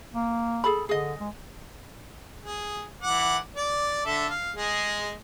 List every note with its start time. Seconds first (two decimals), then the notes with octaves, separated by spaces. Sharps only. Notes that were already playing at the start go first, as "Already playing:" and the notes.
0.14 A#3
0.64 G#4 A4 B5
0.89 D3 G#4 D#5
1.20 G#3
2.42 G#4
3.02 E3 F#5 D6
3.56 D5
4.05 D3 A4 E5
4.30 F5
4.56 G#3 G#4